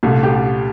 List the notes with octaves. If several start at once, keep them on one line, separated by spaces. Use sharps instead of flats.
C2 A#2 A3
G4